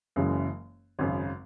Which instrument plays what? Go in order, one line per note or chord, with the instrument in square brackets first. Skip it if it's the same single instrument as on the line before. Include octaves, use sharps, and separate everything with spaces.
[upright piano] F#1 F#2 C#3 E3 G#3
G#1 F#2 C#3